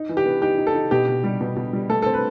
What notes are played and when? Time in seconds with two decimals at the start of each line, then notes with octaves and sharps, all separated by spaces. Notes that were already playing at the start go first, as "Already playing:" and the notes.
Already playing: D#4
0.09 E3
0.17 G4
0.25 B3
0.42 D#4 G4
0.58 D#4
0.67 A4
0.75 D#4
0.91 B2 G4
1.08 B2
1.24 G3
1.41 B2
1.56 B2
1.73 G3
1.89 A3 A4
2.02 C4 A4
2.14 B4